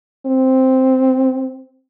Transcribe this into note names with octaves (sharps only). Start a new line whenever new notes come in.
C4